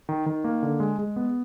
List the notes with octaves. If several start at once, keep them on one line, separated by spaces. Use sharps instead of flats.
D#3
D#3
A#3
D3
G#3
G#3
B3